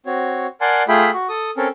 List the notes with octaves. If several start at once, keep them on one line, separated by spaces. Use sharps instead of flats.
C4 F#4 C#5
A#4 D5 F#5 G#5 A5 C6
A3 F4 G#4 E5 G5 B5
F#4
A4 D#6
C4 C#4 A4 A#4